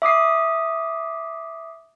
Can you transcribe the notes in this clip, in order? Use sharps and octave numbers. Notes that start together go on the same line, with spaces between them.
E5 D6 D#6 C7